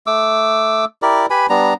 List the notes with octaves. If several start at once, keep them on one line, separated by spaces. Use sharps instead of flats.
A3 D6 E6
E4 G4 A#4 D5
G4 B4 G#5 B5
G3 B3 D4 A#5